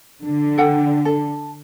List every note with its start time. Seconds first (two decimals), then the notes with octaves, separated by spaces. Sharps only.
0.24 D3
0.58 A4 F#5 G5
1.05 A4